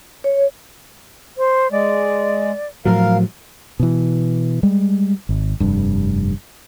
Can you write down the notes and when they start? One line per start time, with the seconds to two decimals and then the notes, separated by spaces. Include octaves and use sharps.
0.24 C#5
1.38 C5
1.72 G#3 D5
2.86 A2 F3 F#3 A#4 F5
3.79 B2 E3
4.63 G3 G#3
5.29 G#1
5.60 F1 G2